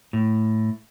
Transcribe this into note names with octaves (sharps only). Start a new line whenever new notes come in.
A2